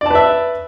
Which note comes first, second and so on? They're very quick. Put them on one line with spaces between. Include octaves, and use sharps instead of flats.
D5 A5 B4 E5